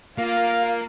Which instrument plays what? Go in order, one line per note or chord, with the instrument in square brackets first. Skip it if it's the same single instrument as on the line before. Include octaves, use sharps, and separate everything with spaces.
[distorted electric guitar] A#3 [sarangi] F4 [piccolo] F5